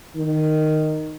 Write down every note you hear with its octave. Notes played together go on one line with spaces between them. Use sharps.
D#3